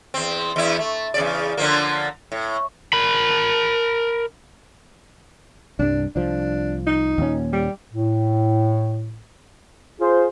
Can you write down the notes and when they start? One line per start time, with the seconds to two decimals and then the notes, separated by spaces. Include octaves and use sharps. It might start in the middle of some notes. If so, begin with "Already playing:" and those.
0.14 E2 C4
0.56 E2 E4
0.79 A3
1.14 E2 C#3 D5
1.57 D3 F3 A#3
2.32 A2
2.93 A#4 B5
5.79 C2 G2 D4
6.16 C2 F3 D4
6.87 D#4
7.18 D#2 A#2 C#4
7.53 G3
7.92 A2
10.00 F4 G#4 C5